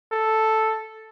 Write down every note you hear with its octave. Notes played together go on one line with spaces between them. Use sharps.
A4